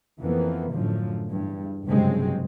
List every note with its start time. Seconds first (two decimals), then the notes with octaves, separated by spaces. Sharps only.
0.20 F2 E3 A#3 B3
0.73 F#2 A2 D3 F3
1.26 E2 G2
1.85 F#1 G2 C3 F#3 G#3 C4